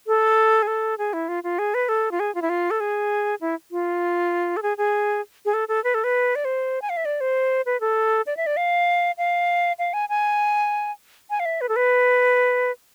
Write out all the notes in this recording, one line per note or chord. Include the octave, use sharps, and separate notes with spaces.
A4
G#4
A4
G#4
E4
F4
F4
G#4
B4
A4
F4
G#4
F4
E4
F4
A4
G#4
E4
F4
A4
G#4
G#4
G#4
A4
A4
B4
A4
B4
D5
C5
G#5
F5
E5
D5
C5
B4
A4
D5
E5
D5
F5
F5
F5
G#5
G#5
G#5
F5
E5
B4
A4
B4